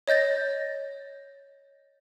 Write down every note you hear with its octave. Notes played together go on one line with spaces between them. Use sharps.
C#5 D#5 G6 A6 A#6